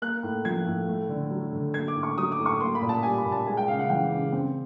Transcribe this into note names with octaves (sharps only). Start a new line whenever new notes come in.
A#3 F#6
A2
F3 G#6
A2
A3
D3
F#3
D3
A#3 G#6
D6
A2
C#6
F#3 D#6
D6
A2
C#6
A#3 C6
B5
A#2
A5
G3 G#5
B5
A#2
A5
G#3 G#5
G5
C#3 F5
F#5
E3 G5
C#3
C4